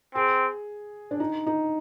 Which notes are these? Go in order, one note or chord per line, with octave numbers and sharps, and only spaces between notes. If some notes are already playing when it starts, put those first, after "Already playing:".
C4 G#4
D4
D#4
D#4